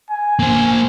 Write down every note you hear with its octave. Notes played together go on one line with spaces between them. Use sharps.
G#5
A#3 C5